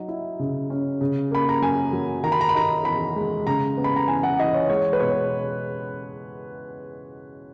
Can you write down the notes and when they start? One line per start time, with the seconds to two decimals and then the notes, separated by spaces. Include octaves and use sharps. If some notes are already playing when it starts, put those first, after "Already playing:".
Already playing: F#3 D#4
0.08 E4
0.39 C#3
0.70 C#4
1.01 C#3
1.31 A#3 B5
1.49 A#5
1.62 F#2 G#5
1.93 F#3
2.24 D#3 A#5
2.32 B5
2.41 A#5
2.49 B5
2.55 D#4 A#5
2.85 E2 B5
3.16 G#3
3.47 C#3 A#5
3.77 B3
3.84 B5
3.96 A#5
4.08 E2 G#5
4.23 F#5
4.39 E3 D#5
4.54 C#5
4.70 G#3 C#5
4.93 B4
5.00 B2 C#5